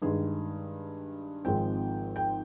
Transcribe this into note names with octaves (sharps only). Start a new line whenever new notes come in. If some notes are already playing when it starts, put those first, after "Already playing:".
G2 D#3 G#3 G#4
G#1 G#2 F3 G#3 C4 G5
G5